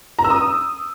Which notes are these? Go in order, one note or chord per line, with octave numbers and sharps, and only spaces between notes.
A#5
E6
D#6